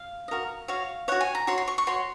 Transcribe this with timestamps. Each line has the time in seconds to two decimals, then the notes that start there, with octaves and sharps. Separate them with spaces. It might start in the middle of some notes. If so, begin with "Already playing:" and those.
Already playing: F5
0.28 F#4 A#4 D#5
0.68 F#4 C#5 F5
1.08 F#4 C#5 F#5
1.21 G#5
1.35 A#5
1.47 F#4 C#5 C6
1.58 C6
1.68 C#6
1.78 C#6
1.87 F#4 C#5 C6